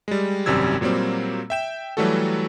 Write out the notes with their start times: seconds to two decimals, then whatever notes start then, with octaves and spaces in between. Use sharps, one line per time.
0.08 G3 G#3
0.46 G#1 F#2 C3 G3 E6 G#6
0.81 A#2 F#3 G3 A#3 C4
1.50 E5 G5 E7
1.97 E3 F#3 G3 A3 F#4 A4